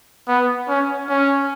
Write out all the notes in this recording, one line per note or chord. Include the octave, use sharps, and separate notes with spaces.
B3
C#4
C#4